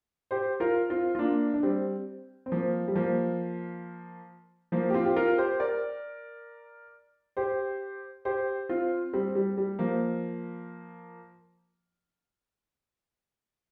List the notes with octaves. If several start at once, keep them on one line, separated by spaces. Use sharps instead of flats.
G4 C5
F4 A#4
C4 F4
F4
A#3 D4
D4
G3 C4
C4
F3 A#3
G3
F3 A#3
F3 A#3
G4
C4 F4
G4
F4 A#4
G4 C5
A#4 D5
G4 C5
G4 C5
C4 F4
G3 C4
G3
G3
F3 A#3